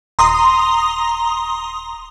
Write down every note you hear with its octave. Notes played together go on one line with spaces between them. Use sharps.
D#1 A#5 C6 D#6